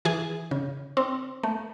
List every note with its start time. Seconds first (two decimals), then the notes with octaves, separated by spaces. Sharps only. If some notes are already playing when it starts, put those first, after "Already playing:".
0.05 E3 G#4 G#5
0.51 C#3
0.97 C4
1.43 A3